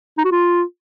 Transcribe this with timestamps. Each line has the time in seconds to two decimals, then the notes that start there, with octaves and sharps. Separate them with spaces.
0.18 D#4
0.25 F#4
0.32 F4